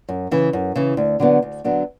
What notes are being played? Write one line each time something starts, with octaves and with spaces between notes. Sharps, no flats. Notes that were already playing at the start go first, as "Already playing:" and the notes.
F#2
C#3 E3
F#2
C#3 E3
D2
D3 F#3 B3 D4
D2
D3 F#3 B3 D4